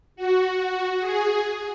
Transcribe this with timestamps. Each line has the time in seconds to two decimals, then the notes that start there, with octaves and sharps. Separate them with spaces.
0.16 F#4
1.00 G#4